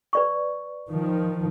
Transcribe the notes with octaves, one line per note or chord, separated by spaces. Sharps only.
B4 D5 C#6
D#3 F3